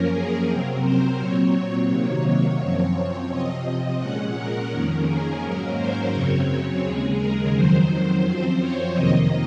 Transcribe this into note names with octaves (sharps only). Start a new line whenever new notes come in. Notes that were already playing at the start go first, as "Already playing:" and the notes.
Already playing: F#2 F3 A#3 C#4 A#4
G#4
C3 F#3 C4 A#4
C5
A#2 F#3 C4 C#5
C#5
C3 D#3 F#3 A#3
C#5
F#2 F3 C4
C3 F3 C4 D#5
A#2 G#3 C#4 F#5
A#4
F2 D#3 A#3 C#4 A#4
G#4
G#2 F#3 A#3 C#4 A#4
C5
F#2 C#3 F#3 C4 C#5
D#2 C#3 G#3 G#4
A#4
F2 D#3 F#3 C5
F#2 F3 C4 C5
C#5
F2 C3 D#3 A#3 D#5